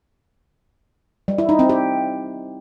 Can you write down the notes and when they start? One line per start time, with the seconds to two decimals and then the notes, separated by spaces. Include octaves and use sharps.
1.28 G3
1.38 E4
1.49 D#4
1.59 C4
1.69 G4